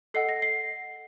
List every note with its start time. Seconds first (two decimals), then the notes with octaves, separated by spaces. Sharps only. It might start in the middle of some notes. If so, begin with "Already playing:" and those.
0.14 A4 D#5 F#5 C7
0.29 A#6
0.42 C7